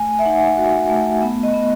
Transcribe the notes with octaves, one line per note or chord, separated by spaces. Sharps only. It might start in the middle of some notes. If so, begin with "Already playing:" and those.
Already playing: A3 G#5
E5
D#4 F#5
F#4
A3
B3
D#5
B3